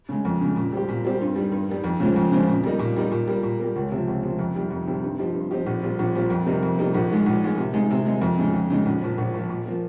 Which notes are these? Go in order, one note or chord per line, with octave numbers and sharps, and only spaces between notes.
C#3 G#3
F2
C#3 G#3
A#2
G3 C4 G4
A#2
G3 C4 G4
G2
G3
D#3
G2
D#3 G3
F2
C#3 F3 G#3 C4
F2
C#3 F3 G#3 C4
A#2
G3 A#3 D#4
A#2
G3 A#3 D#4
A#2
G3 A#3
A#2
G3 A#3
C#2
C3 F3
C#2
C3 F3
F2
C3 D#3 G3
F2
C3 D#3 G3
G2
F3 C4 D#4 G4
G2
F3 C4 D#4 G4
A#1
A#2 G3 C4 F4
A#1
A#2 G3 C4 F4
F2
C3 G3 A#3 D#4
F2
C3 G3 A#3 D#4
A#1
G#2 D#3 G#3
A#1
G#2 D#3 G#3
C3
D#3 G#3 D#4
C3
D#3 G#3 D#4
F2
C#3 G#3 D#4
F2
C#3 G#3 D#4
A#1
A#2 F3
A#1
A#2 F3
A#2
F3 A#3